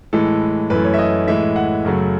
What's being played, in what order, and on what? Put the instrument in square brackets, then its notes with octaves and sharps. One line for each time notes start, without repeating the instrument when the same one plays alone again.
[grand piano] A2 E3 G#3 A4
F#2 E3 A3 B4
C#5
E5
D#5
A2 E3 G#3 E5
F#5
F#2 C#3 F#3 A3